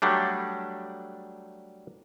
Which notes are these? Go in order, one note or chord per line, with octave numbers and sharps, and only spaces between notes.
F#3 G3 A3 D4